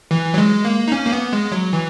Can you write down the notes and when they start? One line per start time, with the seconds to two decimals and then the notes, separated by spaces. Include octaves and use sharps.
0.11 E3
0.34 F#3
0.38 G#3
0.65 A#3
0.88 D#4
0.92 C#4
1.07 A#3
1.12 B3
1.33 G#3
1.52 F#3
1.73 E3